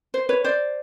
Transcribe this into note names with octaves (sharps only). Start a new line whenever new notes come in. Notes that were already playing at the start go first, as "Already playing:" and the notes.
C5
B4 C#5
C5 D5